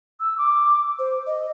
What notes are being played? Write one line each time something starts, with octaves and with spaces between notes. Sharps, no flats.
E6
D6
C5
D#5